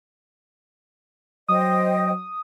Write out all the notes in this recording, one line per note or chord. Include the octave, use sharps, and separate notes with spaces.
F#3 C5 D#5 G5 D#6